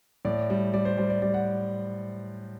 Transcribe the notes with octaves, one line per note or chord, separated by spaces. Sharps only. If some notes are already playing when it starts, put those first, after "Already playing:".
A2 D5
G3
G3 D5
C5
G3 C5
D5
G3 D5
F#5